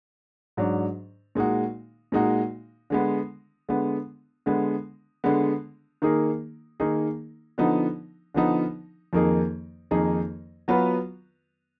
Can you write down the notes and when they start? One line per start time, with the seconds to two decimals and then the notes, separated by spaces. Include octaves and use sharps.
0.57 G#2 F#3 D4
1.35 A#2 G#3 D#4 F#4
2.12 A#2 G#3 D#4 F#4
2.90 D3 G#3 B3
3.69 D3 G#3 B3
4.46 D3 G#3 B3
5.24 D3 G#3 B3
6.02 D#3 A#3 D#4 G#4
6.80 D#3 A#3 D#4 G#4
7.58 D3 F3 B3 D#4
8.34 D3 F3 B3 D#4
9.13 F2 D#3 A#3 D#4 G#4
9.91 F2 D#3 A#3 D#4 G#4
10.68 F#3 B3 F4 B4